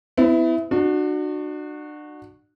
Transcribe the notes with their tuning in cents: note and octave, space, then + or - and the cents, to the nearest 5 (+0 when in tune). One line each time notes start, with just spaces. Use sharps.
B3 +40 E4 +0
D4 +35 F#4 -10